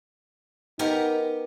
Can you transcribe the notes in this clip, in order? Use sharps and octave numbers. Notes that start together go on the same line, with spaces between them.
B3 D#4 G4 A#4